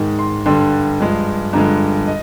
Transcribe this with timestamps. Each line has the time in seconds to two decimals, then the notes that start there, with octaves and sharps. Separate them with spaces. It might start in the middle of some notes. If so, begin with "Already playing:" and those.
Already playing: G#2 D#3 G#3
0.19 C6
0.46 G2 D3 G3 C6
1.00 G2 F3 G#3
1.53 G2 D3 F3 G#3 A#5
2.07 D#5